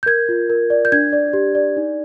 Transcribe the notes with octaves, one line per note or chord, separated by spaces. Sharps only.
G6
A#4 G#6
F4
A#4
D5
G6
D4 G#6
D5
G4
D5
D#4